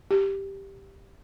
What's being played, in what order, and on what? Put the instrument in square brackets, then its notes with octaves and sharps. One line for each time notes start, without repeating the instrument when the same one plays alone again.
[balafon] G4